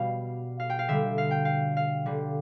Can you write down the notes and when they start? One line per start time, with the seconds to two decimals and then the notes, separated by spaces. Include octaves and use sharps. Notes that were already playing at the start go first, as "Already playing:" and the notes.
Already playing: B2 G3 F5
0.60 F5
0.70 G5
0.79 F5
0.88 D3 G3 E5
1.18 F5
1.31 G5
1.45 F5
1.77 F5
2.06 D3 G3